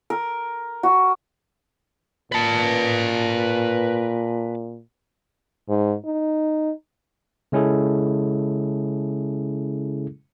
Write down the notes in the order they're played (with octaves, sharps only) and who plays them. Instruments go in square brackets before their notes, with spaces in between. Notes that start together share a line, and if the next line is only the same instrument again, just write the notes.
[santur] A#4
F#4
[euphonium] A#2 [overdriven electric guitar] B4 A5
[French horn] G#2
D#4
[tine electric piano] C#3 G#3 C#4 E4 G#4 A4